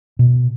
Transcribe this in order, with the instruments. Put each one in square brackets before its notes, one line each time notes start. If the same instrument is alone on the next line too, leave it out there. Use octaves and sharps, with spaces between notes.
[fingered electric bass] B2